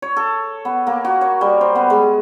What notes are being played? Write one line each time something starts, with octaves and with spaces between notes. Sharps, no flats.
C#5
A4
B3
A#3
F#4
C#5
G3
C5
B3
G#3